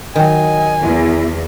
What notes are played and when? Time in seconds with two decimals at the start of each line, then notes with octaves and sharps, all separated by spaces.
0.16 D#3 F#3 D#5 G#5
0.83 E2 E4